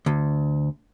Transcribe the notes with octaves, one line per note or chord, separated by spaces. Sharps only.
D2